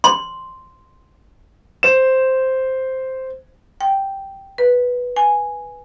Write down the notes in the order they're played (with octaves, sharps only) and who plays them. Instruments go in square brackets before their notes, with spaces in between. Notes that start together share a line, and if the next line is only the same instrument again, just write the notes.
[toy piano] C6
[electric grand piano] C5 E7
[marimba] G5
B4
G#5